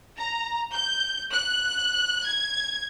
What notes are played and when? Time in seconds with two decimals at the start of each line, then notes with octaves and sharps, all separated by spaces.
0.17 A#5
0.72 G6
1.32 F#6
2.25 G#6